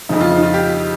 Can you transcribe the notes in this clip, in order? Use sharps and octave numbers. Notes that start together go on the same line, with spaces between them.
F2 C#3 F3 D#4
F4
D#4
F4
G4